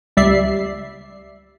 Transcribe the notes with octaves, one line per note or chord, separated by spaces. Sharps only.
C#2 G3 D5 E5 C7